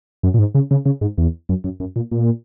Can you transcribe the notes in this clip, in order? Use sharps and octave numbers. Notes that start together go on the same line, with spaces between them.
F#2
A#2
G#2
C#3
C#3
C#3
G#2
E2
F#2
F#2
F#2
A#2
A#2